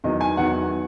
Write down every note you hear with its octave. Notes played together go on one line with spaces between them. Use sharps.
E2 D#3 F#3 D#5
G#5
E2 D#3 F#3 F#5